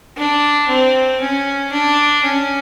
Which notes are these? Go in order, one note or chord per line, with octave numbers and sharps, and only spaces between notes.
D4
C4
C#4
D4
C#4